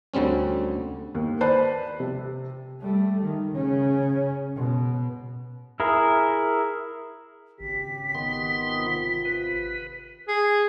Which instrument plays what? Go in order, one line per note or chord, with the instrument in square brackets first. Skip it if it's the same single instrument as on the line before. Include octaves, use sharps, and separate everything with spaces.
[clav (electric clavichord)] D2 D3 G3 C4 C#4
[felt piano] D#2
B4 C5 D5 A5 B5 F#6
C3
[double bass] G3 A3
D#3
C#3 C#4
B2
[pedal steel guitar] E4 G#4 A#4
[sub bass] G#1 [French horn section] C#3 G4 [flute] B6
[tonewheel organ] D#3 B3 C6
[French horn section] C3 F4
[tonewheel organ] B4
[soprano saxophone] G#4